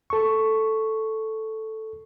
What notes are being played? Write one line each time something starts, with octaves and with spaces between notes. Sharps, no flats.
A4 C#6